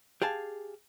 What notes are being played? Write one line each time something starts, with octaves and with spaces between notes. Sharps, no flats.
G4 G#4 F5 A5